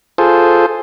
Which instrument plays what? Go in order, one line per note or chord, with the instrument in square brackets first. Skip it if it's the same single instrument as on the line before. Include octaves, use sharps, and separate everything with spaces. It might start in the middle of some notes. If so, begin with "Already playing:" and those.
[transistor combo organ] F4 G#4 A4 C5